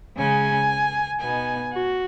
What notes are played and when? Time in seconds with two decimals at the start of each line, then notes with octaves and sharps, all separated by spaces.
0.18 C#3 G#3 C#4 G#5
1.20 B2 B3 D#4 G#5
1.71 F#4